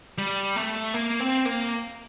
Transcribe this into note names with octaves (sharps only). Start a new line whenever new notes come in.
G3
A3
A#3
C4
A#3